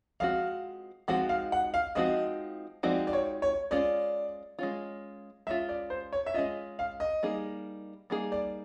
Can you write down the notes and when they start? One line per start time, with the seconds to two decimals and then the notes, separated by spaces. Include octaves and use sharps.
0.20 F3 G#3 C4 D#4 F#4 F5
1.08 F3 G#3 C4 D#4 F#4 F#5
1.29 F5
1.52 F#5
1.74 F5
1.95 F3 G#3 C4 D#4 F#4 D#5
2.83 F3 G#3 C4 D#4 F#4 D5
3.07 D5
3.13 C#5
3.42 C#5
3.71 G#3 C#4 F4 D5
4.59 G#3 C#4 F4
5.47 G#3 C#4 F4 E5
5.69 D5
5.90 C5
6.13 C#5
6.26 E5
6.34 G#3 C#4 F4 D#5
6.79 F5
7.00 D#5
7.23 G3 A#3 D#4 G#4
8.10 G3 A#3 D#4 G#4
8.32 D5